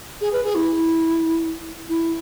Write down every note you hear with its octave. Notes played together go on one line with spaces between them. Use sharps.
G#4
B4
G#4
E4
E4